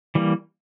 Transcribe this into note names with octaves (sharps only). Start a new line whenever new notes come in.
E3 G3 A#3